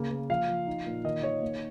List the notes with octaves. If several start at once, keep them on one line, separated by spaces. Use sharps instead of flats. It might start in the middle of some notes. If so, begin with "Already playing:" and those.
Already playing: C#3 A#3
A#3
F3 F5
F3
D#4
A#2
D#3 D#5
D#3 C#5
A#3